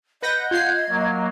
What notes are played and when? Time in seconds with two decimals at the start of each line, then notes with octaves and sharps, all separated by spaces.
0.23 B4 D#5 F#5 G6 A#6
0.51 F4 G#6 C7
0.89 F#3 A#3